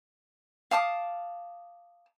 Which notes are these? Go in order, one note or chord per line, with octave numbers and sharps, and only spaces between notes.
F5 A5 D6 D#6